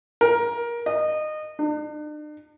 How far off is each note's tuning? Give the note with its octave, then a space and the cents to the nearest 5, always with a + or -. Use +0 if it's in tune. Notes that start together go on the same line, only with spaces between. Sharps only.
A#4 +20
D#5 -20
D4 +45